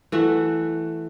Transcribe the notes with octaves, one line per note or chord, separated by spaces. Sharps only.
E3 A3 F#4